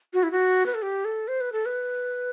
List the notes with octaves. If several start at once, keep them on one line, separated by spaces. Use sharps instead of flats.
F#4
E4
F#4
B4
A4
G4
A4
C5
B4
A4
B4